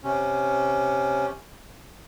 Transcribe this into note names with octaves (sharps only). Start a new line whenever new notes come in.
C3 C#4